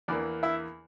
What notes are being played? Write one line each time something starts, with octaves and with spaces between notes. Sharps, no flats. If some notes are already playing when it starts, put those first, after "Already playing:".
E2 E3 A#3 D4 D5
E4 E5